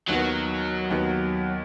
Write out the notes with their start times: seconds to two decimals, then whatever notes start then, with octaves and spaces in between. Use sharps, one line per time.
0.08 D#2 D#3 F#3 B3
0.90 D#2 D#3 B3